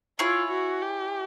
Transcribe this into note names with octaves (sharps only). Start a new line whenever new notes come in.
E4 F4 G#4 C#5
F#4
G4